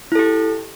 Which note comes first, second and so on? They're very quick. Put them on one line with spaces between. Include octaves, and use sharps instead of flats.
E4 A4 G4